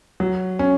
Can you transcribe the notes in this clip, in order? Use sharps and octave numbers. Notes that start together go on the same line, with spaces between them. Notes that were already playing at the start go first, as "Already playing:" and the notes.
F#3
C#4